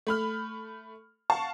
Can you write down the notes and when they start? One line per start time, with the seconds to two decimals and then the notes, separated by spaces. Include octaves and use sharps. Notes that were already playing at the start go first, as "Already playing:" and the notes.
0.07 A3 B5 F6
1.30 F5 F#5 A5 C#6